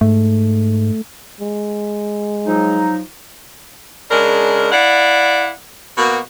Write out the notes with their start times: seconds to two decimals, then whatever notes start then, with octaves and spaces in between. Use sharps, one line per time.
0.01 G#2 A3
1.41 G#3
2.46 F3 F#3 D#4
4.11 C#3 G#3 D4 A#4
4.72 E4 D5 F5 F#5
5.98 B2 A#3 F#4